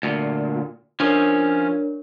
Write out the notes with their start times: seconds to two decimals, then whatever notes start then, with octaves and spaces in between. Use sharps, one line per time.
0.03 D2 A#2
1.00 F3 C#4 D4 A#4 C#5